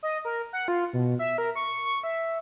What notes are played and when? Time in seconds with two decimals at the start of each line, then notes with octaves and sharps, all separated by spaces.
0.03 D#5
0.25 A#4
0.53 F#5
0.68 F4
0.93 B2
1.19 E5
1.38 A#4
1.55 C#6
1.85 C#6
2.03 E5